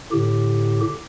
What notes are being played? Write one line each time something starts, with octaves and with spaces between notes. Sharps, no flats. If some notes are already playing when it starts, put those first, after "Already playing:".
A2 D3 G4